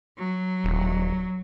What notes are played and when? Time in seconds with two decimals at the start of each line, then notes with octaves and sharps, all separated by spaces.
0.17 F#3
0.64 D#1